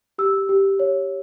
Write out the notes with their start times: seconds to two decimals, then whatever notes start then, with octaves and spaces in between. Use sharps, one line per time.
0.18 G4 E6
0.49 G4
0.79 C#5